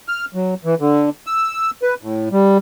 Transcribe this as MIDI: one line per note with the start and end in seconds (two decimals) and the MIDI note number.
0.08 0.25 89
0.34 0.54 54
0.65 0.75 52
0.80 1.10 50
1.26 1.70 88
1.82 1.94 71
2.02 2.29 45
2.32 2.58 55